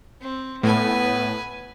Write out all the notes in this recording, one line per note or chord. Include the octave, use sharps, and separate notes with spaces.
C4
A2 B3 B4 G#5